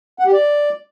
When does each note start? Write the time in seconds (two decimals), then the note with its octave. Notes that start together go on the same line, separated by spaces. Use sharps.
0.19 F#5
0.26 G4
0.33 D5